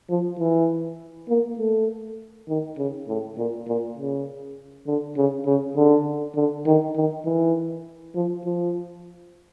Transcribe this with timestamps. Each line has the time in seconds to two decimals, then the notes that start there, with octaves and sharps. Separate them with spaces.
0.10 F3
0.39 E3
1.29 A#3
1.59 A3
2.49 D#3
2.78 C#3
3.08 A2
3.38 A#2
3.67 A#2
3.98 C#3
4.87 D3
5.17 C#3
5.46 C#3
5.77 D3
6.36 D3
6.66 D#3
6.96 D#3
7.25 E3
8.15 F3
8.45 F3